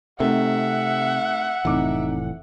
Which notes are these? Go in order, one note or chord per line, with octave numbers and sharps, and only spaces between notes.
C3 A3 C4 D#4 E5 F#5
F1 A2 C3 E3 D#4 D6